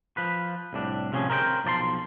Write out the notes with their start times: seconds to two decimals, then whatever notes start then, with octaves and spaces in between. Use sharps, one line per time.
0.17 F3 B4
0.73 C2 A2 D4
1.12 A2 C3 F3 C4 C#4 G#4
1.30 A#4 C5 D#5 G5
1.65 B1 F3 D5 A5 C6